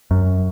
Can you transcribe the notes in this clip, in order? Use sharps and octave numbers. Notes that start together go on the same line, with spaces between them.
F#2